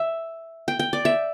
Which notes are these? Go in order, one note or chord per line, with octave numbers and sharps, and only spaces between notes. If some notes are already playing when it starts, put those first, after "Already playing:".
Already playing: E5
G5
G5
D5
E5